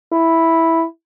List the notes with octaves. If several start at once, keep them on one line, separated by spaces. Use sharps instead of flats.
E4